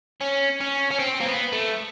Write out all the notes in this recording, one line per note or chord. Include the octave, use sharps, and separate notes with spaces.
C#4
C#4
C#4
C4
A#3
B3
A3